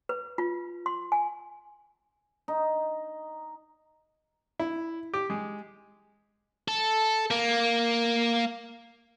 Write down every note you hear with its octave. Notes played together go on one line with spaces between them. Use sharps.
B4
F4
C6
G#5
D#4
E4
G4
G#3
A4
A#3